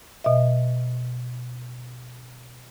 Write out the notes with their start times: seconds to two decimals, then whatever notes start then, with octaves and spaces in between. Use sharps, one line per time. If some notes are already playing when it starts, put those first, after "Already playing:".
0.24 B2 D#5 E5